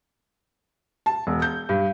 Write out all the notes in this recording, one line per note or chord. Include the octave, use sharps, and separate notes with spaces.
A5
E1
G6
G2